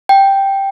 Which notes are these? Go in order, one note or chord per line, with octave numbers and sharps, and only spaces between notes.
G5